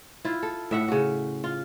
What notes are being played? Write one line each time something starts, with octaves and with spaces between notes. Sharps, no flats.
E4 F4
A4
A2 E5 F#5
C#3 F#4
F4